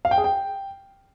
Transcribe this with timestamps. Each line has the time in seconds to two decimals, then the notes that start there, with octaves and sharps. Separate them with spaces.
0.05 F5
0.11 G5
0.18 G#4
0.24 G5